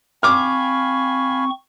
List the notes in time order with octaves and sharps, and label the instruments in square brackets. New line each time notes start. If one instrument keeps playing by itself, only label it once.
[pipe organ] C4 C#6 [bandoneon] F5 G#5 B5 [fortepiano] D6 F6